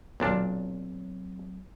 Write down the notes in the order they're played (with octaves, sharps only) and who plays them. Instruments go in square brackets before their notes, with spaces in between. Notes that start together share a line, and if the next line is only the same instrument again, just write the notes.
[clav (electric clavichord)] B1 A#2 D4 [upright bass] F#3 C4